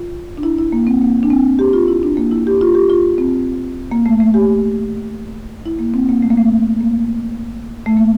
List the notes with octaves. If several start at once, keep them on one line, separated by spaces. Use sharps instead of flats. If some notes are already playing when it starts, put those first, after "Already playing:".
Already playing: F4
D4
E4
E4
A#3
C4
A#3
D4
C4
G4
F4
E4
D4
A#3
E4
G4
F4
G4
F4
C4
A#3
A3
A3
G4
E4
A#3
C4
A#3
A3
A#3
A3
A#3
A3
A#3